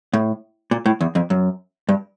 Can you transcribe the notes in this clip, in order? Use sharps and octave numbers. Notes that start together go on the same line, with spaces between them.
A2
A#2
A2
E2
F2
F#2
G2